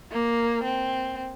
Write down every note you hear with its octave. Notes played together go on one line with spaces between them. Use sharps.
A#3
C4